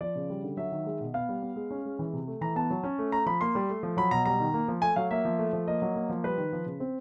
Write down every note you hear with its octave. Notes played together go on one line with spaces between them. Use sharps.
F3 D5
C#3
G3
D3
F#3 E5
D#3
G#3
B2
B3 F5
G3
B3
G#3
C#4
G#3
E3
C3
A3
E3 A#5
B3 A5
F#3
C#4
A3
A3 A#5
F3 B5
A#3 C6
G3
A3
F3
F#3 B5
B2 A#5
G3 A#5
D#3
A#3
F3
A3 G#5
F#3 F5
A#3 E5
F3
A3
F3
A#3 D#5
F#3
A#3
F3
G3 B4
D#3
F3
C#3
C4